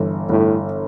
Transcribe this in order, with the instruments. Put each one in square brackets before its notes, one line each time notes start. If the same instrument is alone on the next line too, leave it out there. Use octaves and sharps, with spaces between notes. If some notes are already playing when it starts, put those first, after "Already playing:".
Already playing: [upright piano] G1 E3
[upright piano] G1 [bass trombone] A2